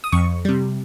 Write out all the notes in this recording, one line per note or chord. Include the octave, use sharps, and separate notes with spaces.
D#6
F2 C#6
C3 G3